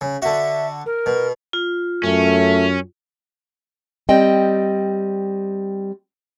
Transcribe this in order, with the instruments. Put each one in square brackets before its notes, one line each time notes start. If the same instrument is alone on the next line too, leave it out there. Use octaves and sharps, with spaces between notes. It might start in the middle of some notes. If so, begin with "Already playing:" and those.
[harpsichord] C#3
[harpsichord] D3 F#4 [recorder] E5
[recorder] A#4
[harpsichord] B2
[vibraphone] F4
[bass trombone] F#2 [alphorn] A3 [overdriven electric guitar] C#4
[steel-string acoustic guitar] G3 C4 D#5 G5